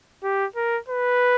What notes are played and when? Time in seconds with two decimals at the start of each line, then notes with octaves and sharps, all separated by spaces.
0.23 G4
0.56 A#4
0.89 B4